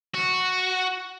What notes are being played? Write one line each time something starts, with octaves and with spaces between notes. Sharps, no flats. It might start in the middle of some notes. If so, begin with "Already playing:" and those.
F#4